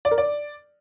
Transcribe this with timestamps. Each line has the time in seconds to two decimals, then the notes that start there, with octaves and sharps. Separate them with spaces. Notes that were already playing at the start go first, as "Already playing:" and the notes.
0.05 D5
0.11 A#4
0.18 D5